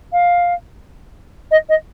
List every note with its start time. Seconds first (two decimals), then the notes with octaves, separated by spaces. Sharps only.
0.12 F5
1.51 D#5
1.69 D#5